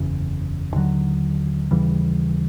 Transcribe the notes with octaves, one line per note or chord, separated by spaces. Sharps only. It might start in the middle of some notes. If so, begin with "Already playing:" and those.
Already playing: F#1 E2 C#3
D#2 D3 F#3
D#2 C#3 E3 G3